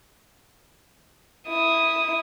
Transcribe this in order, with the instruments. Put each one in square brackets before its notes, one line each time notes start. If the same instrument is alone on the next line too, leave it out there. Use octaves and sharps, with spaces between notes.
[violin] E4 D#6